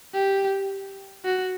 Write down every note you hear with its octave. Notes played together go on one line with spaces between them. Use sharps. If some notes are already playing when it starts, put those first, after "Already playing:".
G4
F#4